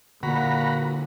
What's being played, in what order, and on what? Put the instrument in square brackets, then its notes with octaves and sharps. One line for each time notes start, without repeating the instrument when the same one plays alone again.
[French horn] A#2 [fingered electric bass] D3 A#3 [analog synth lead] F#4 [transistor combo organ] F#5 A#5 B5